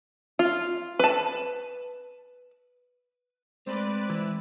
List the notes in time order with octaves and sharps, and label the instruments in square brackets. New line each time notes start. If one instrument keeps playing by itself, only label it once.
[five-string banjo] F4
B4 A5
[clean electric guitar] G#3 A3 A4 [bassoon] C4 [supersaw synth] B4 D5
[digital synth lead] E3